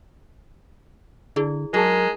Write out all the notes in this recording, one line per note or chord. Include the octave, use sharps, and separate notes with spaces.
D3 E4 G#4 D5
F#3 G#3 D#4 G#4 A#4 A5